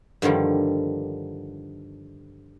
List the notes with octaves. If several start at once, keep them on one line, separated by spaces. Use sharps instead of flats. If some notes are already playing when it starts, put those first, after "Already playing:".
G2 D3 D#3 F3 G3